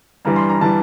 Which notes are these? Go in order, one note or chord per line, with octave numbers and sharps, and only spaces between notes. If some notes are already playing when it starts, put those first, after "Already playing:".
G2 E3 G3 A#5
C6
A#5
E3 G3 A5